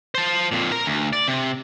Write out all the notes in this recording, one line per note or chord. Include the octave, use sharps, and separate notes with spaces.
C5 A5
F2 A#2
A#4 A#5
D2
D5
C3